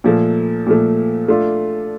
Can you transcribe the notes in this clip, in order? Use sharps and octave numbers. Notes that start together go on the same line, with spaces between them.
A#2 F3 A3
A#2 F3 A3
A3 D4 F4